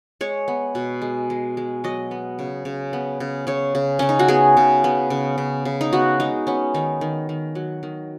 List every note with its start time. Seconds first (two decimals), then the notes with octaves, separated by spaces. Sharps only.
0.21 G#3 C#5
0.48 B3
0.75 B2
1.02 G#3
1.30 G#3
1.57 G#3
1.84 F#3 D#5
2.11 B3
2.39 C#3
2.65 C#3
2.93 B3
3.20 C#3
3.47 C#3 C#5
3.75 C#3
3.99 C#3 C#4
4.09 D#4
4.19 F#4
4.28 B3 G#4
4.57 C#3
4.84 B3
5.10 C#3
5.38 C#3
5.65 C#3
5.81 D#4
5.93 B3 F#4
6.20 G#3 D#4
6.47 B3 C#4
6.74 D#3 D#4
7.01 D#3
7.29 D#3
7.55 F#3
7.83 D#3